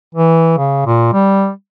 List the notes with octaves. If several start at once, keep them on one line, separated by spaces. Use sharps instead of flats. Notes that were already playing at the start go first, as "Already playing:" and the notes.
E3
C#3
A#2
G3